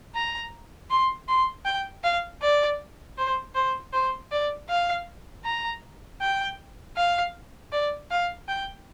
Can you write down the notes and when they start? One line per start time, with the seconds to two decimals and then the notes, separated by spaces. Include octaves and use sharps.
0.15 A#5
0.90 C6
1.28 C6
1.65 G5
2.04 F5
2.42 D5
3.18 C5
3.55 C5
3.93 C5
4.32 D5
4.69 F5
5.44 A#5
6.21 G5
6.97 F5
7.72 D5
8.10 F5
8.48 G5